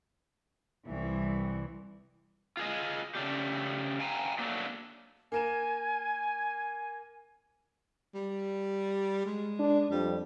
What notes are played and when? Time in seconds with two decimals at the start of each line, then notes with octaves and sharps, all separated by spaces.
0.85 C2 E3
2.57 F4 G#4 D#5
3.15 C#3 A3 C#4 D4 G4
4.00 F5 G5 G#5 A#5
4.39 F#3 A3 A#3 D4
5.32 A#3 A#4 G#5 E7
8.14 G3
9.25 G#3
9.59 D4
9.91 F2 G3